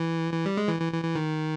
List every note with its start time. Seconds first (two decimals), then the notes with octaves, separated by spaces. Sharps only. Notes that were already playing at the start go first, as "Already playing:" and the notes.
Already playing: E3
0.33 E3
0.46 G3
0.57 G#3
0.69 E3
0.80 E3
0.92 E3
1.04 E3
1.16 D#3